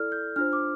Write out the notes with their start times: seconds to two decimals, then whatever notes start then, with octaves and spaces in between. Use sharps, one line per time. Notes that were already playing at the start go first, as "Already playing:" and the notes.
Already playing: E4 A4 D5 F6
0.12 G6
0.36 D4 F4 C5 F6
0.53 D6